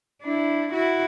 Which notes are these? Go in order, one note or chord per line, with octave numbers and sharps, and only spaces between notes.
D4 E4
E4 F#4